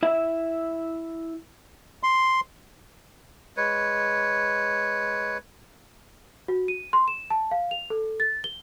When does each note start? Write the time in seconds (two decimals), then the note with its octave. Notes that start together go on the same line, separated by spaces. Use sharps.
0.03 E4 E5
2.03 C6
3.57 G#3 B4 C#5
6.48 F#4
6.68 D#7
6.93 C6
7.08 E7
7.30 A5
7.51 F5
7.71 F7
7.90 A4
8.20 A6
8.44 G7